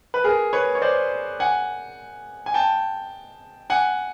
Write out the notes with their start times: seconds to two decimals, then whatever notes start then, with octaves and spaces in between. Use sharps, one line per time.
0.14 B4
0.24 G#4 A#4
0.53 B4 C#5
0.75 C#5
0.82 C5 D5
1.40 F#5 G#5
2.46 G#5
2.54 G5 A5
3.70 F#5 G#5